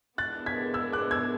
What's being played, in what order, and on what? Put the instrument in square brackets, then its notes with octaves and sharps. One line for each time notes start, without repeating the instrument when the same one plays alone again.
[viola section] E3 G#3 B3 D4 [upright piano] F#6 A6
[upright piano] G#6 B6
E6 G#6
D6 F#6
E6 G#6